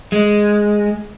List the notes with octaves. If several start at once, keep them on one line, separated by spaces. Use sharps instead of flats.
G#3